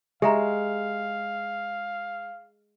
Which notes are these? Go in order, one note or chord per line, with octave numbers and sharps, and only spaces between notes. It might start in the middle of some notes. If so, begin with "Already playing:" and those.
G#3 G4 E5 F5 A#5